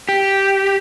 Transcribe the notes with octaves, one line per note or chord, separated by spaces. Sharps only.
G4